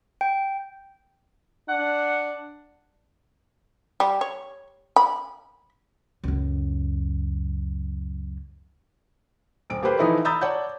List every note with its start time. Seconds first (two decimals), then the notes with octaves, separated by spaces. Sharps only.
0.21 G5
1.69 D4 F#5
4.00 G3
4.21 C#5
4.96 B5
6.24 C#2 F#2
9.70 D#1 D7
9.82 A#3 G4 A4 B4 C5
9.98 E3 F3 D#4 E4 A4 B4
10.25 A#5 B5 D#6 E6 G6 A6
10.41 C#5 D5 F#5 A5 G6